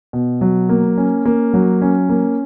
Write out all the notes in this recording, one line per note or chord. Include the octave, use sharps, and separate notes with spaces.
B2
F#3
A#3
C#4
A#3
F#3
C#4
A#3